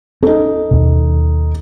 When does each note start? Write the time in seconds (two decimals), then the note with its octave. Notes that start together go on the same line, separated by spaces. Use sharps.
0.23 C#4 D#4 A4
0.71 D#2 B2